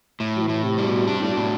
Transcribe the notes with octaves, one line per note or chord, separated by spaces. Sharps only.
A2
F#3
E3
A2
C3
G3
B2
C3 D4
A2
B2
A2
B2